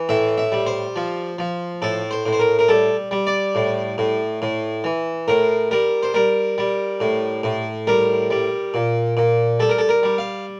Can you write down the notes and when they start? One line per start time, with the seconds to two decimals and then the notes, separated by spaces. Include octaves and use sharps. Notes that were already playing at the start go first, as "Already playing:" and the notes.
Already playing: E3
0.09 A2 E5
0.38 E5
0.52 G3
0.66 C5
0.96 F3
1.39 F3
1.82 A2 A4
2.11 C5
2.26 A2
2.33 C5
2.39 A#4
2.59 A#4
2.69 G3 A4
3.11 G3
3.27 D5
3.55 A2
3.98 A2
4.42 A2
4.84 E3
5.28 A2 A#4
5.71 G3 A#4
6.03 C5
6.14 G3 A#4
6.58 G3
7.00 A2
7.43 A2
7.87 G3 A#4
8.30 G3
8.74 A#2
9.17 A#2
9.60 G3 A4
9.69 A#4
9.78 A4
9.89 A#4
10.03 G3
10.18 F5